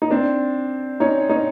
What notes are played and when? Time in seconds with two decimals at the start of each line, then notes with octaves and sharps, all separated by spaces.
0.02 D#4
0.11 C4 D4
1.00 C#4 D#4
1.29 C#4 D#4